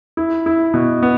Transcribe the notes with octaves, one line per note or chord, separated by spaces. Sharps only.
E4
E4
B2
B3